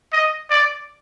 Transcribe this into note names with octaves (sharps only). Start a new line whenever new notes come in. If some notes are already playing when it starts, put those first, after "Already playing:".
D#5
D5